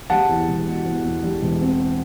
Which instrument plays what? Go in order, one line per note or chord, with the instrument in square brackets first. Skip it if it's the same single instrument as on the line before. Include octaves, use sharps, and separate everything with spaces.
[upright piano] G3 [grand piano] F#5 A5
[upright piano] E2
E1
B2
E2
E2
G3
E1
C4